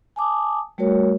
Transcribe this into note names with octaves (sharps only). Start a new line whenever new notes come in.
G#5 A5 D6 D#6
G3 A3 F#4 A#4 C#5